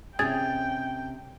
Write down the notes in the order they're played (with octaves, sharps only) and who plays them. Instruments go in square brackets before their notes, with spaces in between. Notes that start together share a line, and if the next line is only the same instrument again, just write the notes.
[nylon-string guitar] C3 C#4 [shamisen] E3 G#4 [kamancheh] G5 [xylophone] G#6 A6